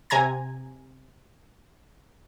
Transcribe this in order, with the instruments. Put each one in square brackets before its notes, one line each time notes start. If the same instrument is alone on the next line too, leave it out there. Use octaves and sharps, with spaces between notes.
[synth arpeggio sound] C3 G#5 A#5 G#6